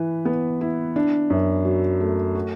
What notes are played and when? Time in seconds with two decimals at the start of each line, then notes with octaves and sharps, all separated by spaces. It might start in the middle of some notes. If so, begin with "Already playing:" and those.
Already playing: E3 B4
0.25 B3
0.61 E4
0.96 D4
1.30 F#2
1.65 F#3
2.00 A3
2.35 F#4